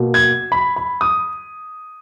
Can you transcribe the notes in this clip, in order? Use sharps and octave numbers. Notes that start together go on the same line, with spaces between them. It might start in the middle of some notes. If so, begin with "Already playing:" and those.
Already playing: B2 A#3
G#6
B5
B5
D#6